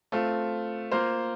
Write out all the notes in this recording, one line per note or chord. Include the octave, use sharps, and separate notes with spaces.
A3 C4 F4
A#3 F4 C5